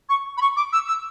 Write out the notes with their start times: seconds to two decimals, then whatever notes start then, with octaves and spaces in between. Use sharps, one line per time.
0.09 C#6
0.37 B5
0.41 C#6
0.56 D6
0.72 E6
0.87 E6